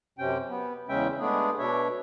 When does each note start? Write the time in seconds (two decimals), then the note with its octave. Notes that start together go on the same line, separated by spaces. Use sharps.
0.19 F#2 C3 C#4 G5
0.49 B3
0.89 E2 C#3 G#3 C#4 E5 G5
1.19 G#3 A3 B3 D4 G#4
1.59 B2 D4 C#5 E5